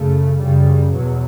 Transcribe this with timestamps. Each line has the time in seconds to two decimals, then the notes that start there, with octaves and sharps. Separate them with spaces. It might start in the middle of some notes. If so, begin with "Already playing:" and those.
Already playing: F#2 C#3 A3
0.39 F#2 C#3 G3
0.93 E2 B2 F#3